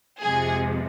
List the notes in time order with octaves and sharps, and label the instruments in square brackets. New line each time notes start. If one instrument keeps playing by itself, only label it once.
[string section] F2 C3 F3 G#3 G#4